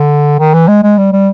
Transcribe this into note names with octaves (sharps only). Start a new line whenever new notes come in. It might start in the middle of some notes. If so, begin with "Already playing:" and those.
Already playing: D3
D#3
E3
G#3
G#3
G3
G3